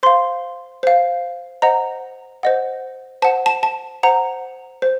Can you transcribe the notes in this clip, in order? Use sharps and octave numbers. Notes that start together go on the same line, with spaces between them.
C5 F5 C6
C5 F5
C5 D#5 F#5 A#5
C5 D#5 F#5
C5 F#5 A5
A5
A5
C5 F#5 A#5
C5